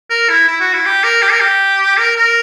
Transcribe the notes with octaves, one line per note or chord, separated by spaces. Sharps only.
A#4
E4
E4
F#4
E4
G4
A#4
G4
A#4
G4
A#4
A#4